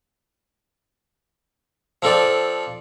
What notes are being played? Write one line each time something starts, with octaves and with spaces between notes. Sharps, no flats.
F3 C4 A4 D5